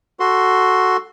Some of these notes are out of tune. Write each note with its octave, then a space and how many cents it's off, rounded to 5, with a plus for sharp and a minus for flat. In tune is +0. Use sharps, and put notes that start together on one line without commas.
F#4 +0 A4 +5 C6 +0